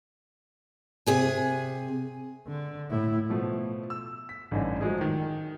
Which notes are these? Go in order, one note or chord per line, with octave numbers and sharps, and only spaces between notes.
C3 G#4 G#5
D3
A2 E4
B2 F3 A3
E6
B6
A1 G2 D3 D#4 G#5
F3 F#3 G#3 A3 G#4 A4
D#3